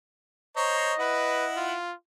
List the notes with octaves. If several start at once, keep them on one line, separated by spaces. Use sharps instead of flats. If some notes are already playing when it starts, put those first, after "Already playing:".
C5 C#5 D#5 A#5
E4 B4 F#5
F4